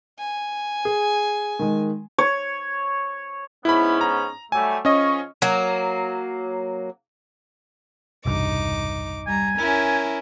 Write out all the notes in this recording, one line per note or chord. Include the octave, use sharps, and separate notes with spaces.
G#5
G#4
D#3 G#3
C#5
G#2 B3 C#4 E4 B5
A#5
F#3 G3 A3 G#5
F3 C#4 G#4 D#5 C#6
F#3 A#3
E1 C2 G2 D#4 D6
G3 G#5 A#5
C#4 E4 A#4